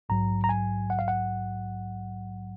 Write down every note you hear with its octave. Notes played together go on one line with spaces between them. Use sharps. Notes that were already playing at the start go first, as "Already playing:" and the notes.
A#1 G#2 F#3 A#5
A#5
G#5
F#5
F5
F#5